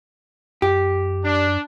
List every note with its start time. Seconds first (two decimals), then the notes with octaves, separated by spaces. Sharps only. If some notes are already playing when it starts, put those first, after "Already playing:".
0.62 F#2 G4
1.24 D4